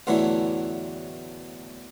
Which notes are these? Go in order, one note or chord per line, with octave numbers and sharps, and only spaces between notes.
A1 E2 D3 E3 F#3 A3